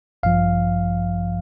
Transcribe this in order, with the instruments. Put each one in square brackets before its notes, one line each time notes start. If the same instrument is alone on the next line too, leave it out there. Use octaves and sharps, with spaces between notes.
[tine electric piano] A1 G2 F3 F5